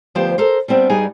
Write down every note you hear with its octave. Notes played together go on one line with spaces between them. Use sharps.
D2 F3 B3 G4 C5
A4 A#4 C5
G3 B3 C4 D4
G2 G3 D#4 G#4 G#5